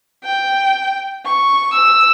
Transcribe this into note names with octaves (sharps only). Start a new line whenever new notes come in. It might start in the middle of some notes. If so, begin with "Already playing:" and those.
G5
C#6
E6